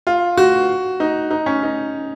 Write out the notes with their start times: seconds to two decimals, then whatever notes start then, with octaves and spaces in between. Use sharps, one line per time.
0.07 F4
0.37 F#4
1.00 D#4
1.31 D#4
1.46 C#4
1.63 D#4